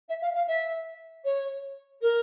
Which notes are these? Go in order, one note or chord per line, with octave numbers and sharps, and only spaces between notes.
E5
F5
F5
E5
C#5
A#4